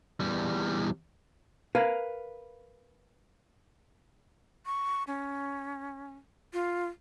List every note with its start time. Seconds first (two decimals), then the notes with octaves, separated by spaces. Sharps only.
0.20 E2 G3
1.75 A#4 B4 F5
4.66 C#6
5.07 C#4
6.53 F4